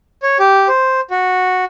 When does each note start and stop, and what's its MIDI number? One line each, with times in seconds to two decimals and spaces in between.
0.23 0.38 73
0.40 0.68 67
0.68 1.01 72
1.11 1.65 66